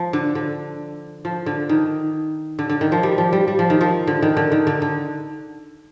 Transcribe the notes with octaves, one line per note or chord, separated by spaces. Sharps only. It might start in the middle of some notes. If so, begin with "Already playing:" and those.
Already playing: F3
D3
D3
F3
D3
D#3
D3
D3
D#3
F3
G3
F3
G3
G3
F3
D#3
F3
D3
D#3
D3
D#3
D3
D3